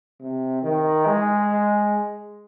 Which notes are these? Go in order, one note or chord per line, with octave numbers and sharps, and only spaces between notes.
C3
D#3
G#3